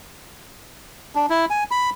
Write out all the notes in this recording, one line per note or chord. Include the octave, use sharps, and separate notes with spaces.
D4
E4
G#5
B5